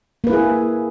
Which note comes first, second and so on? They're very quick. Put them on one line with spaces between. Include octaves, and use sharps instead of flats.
A#3 B4 E4 G#4